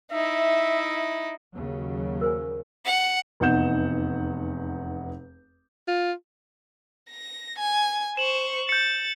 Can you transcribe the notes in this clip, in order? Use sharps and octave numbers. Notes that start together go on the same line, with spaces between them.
D#4 E4 E5
D#2 C#3 F#3
A#4 C5 G#5
F#5
F1 E2 D#4 F#5 G6 E7
F4
A#6
G#5
C5 C#6 E7 F#7
G6 A6 C#7